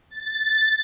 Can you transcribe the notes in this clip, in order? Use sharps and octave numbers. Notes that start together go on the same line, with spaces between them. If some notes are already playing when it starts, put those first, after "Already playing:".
A6